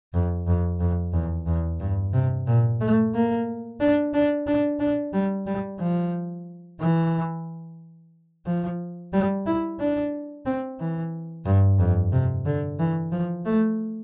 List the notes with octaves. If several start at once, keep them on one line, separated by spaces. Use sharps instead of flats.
F2
F2
F2
E2
E2
G2
C3
A#2
A3
A#3
D4
D4
D4
D4
G3
G3
F3
E3
F3
G3
E4
D4
C4
E3
G2
F2
C3
D3
E3
F3
A3